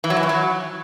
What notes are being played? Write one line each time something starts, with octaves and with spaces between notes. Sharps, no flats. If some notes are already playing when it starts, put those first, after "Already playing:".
E3
F#3
E3
F#2
F#3